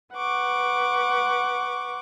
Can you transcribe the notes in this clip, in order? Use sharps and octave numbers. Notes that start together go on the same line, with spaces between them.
B4 F#5 C#6 D6